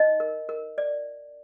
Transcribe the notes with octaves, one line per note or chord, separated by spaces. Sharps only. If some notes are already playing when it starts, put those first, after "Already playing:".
Already playing: D#4 D#5
A#4
A#4
D5